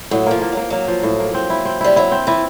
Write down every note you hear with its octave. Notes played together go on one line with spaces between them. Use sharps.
A2 F#3
F3 A#3
A#3
F#3
F3 A#3
F#3 A#3
F3
A2
A#3
C4
E4
C4
G3 E4
F#3 E4
C4
E3 E4